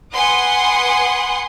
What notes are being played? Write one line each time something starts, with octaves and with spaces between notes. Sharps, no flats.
B4 F#5 G#5 C6 D#6